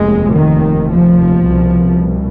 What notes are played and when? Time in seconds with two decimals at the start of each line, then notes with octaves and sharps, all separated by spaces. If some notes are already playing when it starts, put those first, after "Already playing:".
Already playing: F1 D#2 G#3
0.33 D#3
0.89 F3
1.46 C2 B2